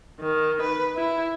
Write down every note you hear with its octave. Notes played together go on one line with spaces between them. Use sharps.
D#3
B4
E4